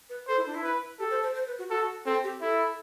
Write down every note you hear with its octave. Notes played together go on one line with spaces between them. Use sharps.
B4
A4 C5
E4
D4
E4
B4
G4 A4
C5
C5
C5
B4
F#4
F#4 A4
C4 A4
G4
E4 A4